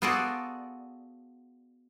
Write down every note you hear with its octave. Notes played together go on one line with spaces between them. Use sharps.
B3 F4 F#4 G#4 A4 D5